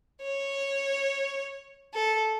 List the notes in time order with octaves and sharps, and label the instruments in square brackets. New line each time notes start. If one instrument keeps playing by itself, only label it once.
[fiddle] C#5
A4